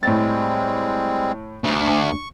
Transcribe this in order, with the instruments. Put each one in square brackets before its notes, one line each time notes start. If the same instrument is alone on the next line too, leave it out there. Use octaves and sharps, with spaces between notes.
[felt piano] A2 A6 [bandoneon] G3 G#3 C4
[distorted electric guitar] D2 [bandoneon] C#6